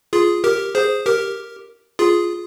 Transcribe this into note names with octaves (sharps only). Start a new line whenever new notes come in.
F4 G#4
G4 A#4
G#4 C5
G4 A#4
F4 G#4